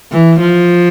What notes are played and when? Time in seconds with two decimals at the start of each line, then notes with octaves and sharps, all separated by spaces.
0.12 E3
0.40 F3